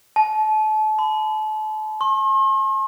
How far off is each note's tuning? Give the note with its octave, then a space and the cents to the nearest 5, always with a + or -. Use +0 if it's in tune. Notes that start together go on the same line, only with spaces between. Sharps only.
A5 -35
B5 +45
C6 +45